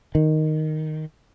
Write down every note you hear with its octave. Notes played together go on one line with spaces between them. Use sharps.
D#3